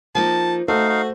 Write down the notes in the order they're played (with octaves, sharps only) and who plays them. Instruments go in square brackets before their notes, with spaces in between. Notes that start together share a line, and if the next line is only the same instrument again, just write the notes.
[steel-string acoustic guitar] F3 A#3 D#4 [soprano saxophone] A5
[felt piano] A3 [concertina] D#4 F5 [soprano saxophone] F#4 [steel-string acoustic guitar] C5
[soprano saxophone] F#4